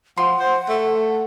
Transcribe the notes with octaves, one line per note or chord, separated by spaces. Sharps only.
F3 F#5 C6
C5
A3